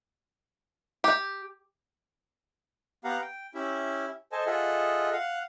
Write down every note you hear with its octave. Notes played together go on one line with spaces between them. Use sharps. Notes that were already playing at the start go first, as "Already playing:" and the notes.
G4
B3 G4 F5 F#5 A#5
G5
C#4 E4 G4 E5
A4 C5 D#5 G#5 A5
F4 G#4 A4 D#5 E5 F#5
F5 F#5